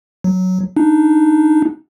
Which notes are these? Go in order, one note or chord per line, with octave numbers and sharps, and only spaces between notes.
F#3
D4 D#4